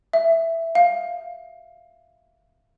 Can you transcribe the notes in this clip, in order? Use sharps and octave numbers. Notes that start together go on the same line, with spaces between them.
E5
F5